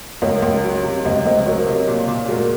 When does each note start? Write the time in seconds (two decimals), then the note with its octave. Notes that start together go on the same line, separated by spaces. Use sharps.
0.22 C#2 A#4 C#5
0.42 C#2
0.64 F#3
0.84 C3
1.04 C#2 C5 D#5
1.25 C#2 C5 D#5
1.46 F#3 A#4 C#5
1.67 C3
1.88 A#2
2.08 A#2
2.28 G#3 F#4 A#4